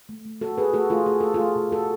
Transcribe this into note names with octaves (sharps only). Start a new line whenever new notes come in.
A3
A3
B2 F#4 A4
B2 G#4 B4
A3 F#4 A4
A3 F4 G#4
A3 G#4
A3 A4
F4 G#4
A3
B2
B2 F#4 A4